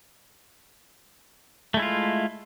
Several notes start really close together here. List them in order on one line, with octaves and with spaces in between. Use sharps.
A3 G#3 E4 F4